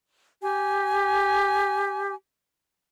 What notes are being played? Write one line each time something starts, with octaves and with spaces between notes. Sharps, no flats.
G4 G#5